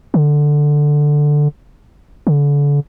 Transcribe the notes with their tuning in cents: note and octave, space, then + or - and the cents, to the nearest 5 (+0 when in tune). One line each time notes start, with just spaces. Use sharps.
D3 +5
D3 -35